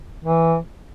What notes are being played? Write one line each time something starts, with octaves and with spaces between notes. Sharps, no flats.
E3